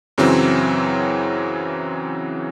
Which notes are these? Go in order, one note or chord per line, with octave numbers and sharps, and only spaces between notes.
F#2 C#3 E3 F#3 C4